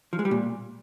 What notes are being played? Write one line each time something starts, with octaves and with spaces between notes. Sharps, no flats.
F3
G#3
G3
A#2